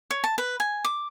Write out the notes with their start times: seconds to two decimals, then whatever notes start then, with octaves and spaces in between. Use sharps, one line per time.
0.11 C#5
0.24 A5
0.38 B4
0.60 G#5
0.85 D6